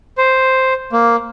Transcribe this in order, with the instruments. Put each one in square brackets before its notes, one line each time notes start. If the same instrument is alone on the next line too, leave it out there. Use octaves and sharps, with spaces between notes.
[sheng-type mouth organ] C5
A#3